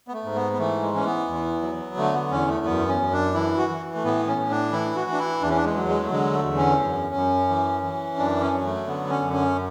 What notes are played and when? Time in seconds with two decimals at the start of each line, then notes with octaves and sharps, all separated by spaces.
0.08 B3
0.13 A3
0.24 G#2
0.35 B3
0.52 B3
0.59 E3 A3
0.82 G#3
0.94 E3 C#4
1.05 B3
1.28 E2
1.62 F#3
1.97 D3 A3
2.14 B3
2.31 E2 C#4
2.48 A3
2.66 F#2 B3
2.89 C#4
3.01 F#2
3.12 D4
3.34 E3 E4
3.58 F#4
3.70 E3
3.95 A3
4.04 A2 B3
4.27 C#4
4.38 A2
4.50 D4
4.72 E3 E4
4.96 F#4
5.07 E3
5.13 D4
5.18 E4
5.42 E2 D4
5.50 C#4
5.56 D4
5.64 G#3
5.76 F#3
5.88 G#3
6.03 A3
6.11 D3 G#3
6.34 A3
6.46 E2
6.57 C#4
6.80 F#2
7.15 F#2
7.49 E3
7.83 E3
8.17 F#2 D4
8.41 C#4
8.53 F#3
8.64 A3
8.87 D3 B3
9.10 C#4
9.22 F#2
9.33 C#4